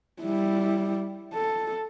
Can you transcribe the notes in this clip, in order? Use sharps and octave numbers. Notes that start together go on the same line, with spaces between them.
G3 E4
A4